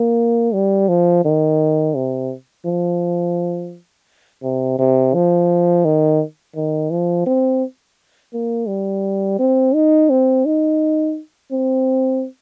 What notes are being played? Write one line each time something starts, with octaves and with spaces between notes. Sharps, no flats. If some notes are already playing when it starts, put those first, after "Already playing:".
Already playing: A#3
G3
F3
D#3
C3
F3
C3
C3
F3
D#3
D#3
F3
C4
A#3
G3
C4
D#4
C4
D#4
C4